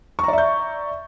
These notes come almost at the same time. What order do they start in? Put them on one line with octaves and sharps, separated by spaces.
C#6 A#5 D5 E5 G6